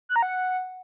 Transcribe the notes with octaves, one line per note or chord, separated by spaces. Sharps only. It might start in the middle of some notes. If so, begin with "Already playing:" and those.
F#6
A#5
F#5